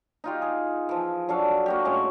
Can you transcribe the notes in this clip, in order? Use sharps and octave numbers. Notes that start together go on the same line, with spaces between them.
D#4 F4 G4
G#4
E3 F3
F#3 D4 A4 F5
A#3 F#4 G4
A2 G#3 C#4